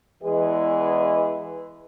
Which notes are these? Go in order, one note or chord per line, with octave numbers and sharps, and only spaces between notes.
E2 E3 G#3 G#4 B4 D#5